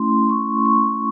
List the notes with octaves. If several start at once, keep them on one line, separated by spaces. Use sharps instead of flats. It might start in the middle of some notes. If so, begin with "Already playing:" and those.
Already playing: A3 C#4 E4 C6
C#6
C#6